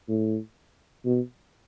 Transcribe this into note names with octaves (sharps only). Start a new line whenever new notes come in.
A2
B2